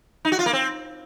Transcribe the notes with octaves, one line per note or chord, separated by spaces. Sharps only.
D#4
F#4
F4
A#3
C4